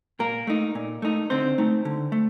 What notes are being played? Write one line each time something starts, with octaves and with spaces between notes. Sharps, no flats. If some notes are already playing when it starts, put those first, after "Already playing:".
A#2 A#3 A#4
A3 D#4
A#2
A3 D#4
D3 C4 C5
A3 D#4
D3
A3